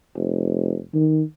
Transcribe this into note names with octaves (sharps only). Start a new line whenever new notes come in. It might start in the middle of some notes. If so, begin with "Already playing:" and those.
F1
D#3